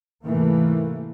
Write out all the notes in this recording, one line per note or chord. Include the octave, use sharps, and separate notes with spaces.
G#2 C3 E3 A3 A#3